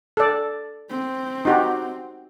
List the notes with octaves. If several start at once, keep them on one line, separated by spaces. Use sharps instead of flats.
A4 D5
C4
D#4 F#4 G4